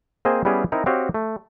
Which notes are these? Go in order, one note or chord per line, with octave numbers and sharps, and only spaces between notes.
A#3 C4 G#4 C5 D#5 G#5
G3 B3 C#4 E4 G4 G#4
C4 D#4 E4 A#4
C4 F#4 G4 C#5 D#5 F5
A3